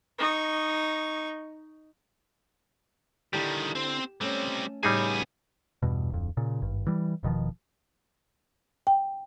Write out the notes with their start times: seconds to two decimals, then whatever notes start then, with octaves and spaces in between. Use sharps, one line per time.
0.19 D#4 C#6
3.33 D3 D#3 G3 D4 E4 G4
3.75 C4 C5
4.21 G3 A3 C4 C#4
4.83 A2 C#3 G3 B3 D#4 G#4 G#5
5.82 E2 G2 B2
6.10 D1 F2
6.37 A#2 C#3
6.62 G#1 G2
6.86 E3 G3
7.23 E1 B2 D#3 F3
8.87 G5